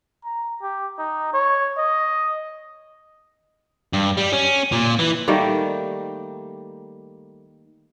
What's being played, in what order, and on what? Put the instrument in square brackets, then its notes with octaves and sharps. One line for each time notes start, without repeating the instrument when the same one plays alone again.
[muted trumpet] A#5
G4
D#4
C#5
D#5
[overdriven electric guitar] G2
G3
C#4
A#2
E3
[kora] D#3 G3 A3 A#3